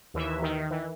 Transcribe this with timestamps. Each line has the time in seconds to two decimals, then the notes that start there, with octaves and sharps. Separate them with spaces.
0.14 D#2 E3 E5
0.42 D#3
0.71 E3